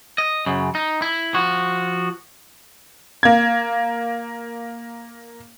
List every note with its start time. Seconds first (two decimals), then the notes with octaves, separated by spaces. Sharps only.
0.18 D#5
0.46 F#2 C#3
0.75 D#4
1.02 E4
1.34 F3 F#4
3.23 A#3 G#6